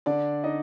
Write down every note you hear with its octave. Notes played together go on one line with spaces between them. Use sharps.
D3 D4 D5
D#4 D#5